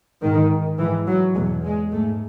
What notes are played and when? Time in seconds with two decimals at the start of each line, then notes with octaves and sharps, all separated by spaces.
0.22 G#2 D#3
0.78 G#2 E3
1.07 F#3
1.35 E2 B2 G#3
1.64 G#3
1.91 G#2 A3